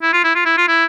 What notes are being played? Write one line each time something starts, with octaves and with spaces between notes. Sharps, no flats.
E4
F4
E4
F4
E4
F4
E4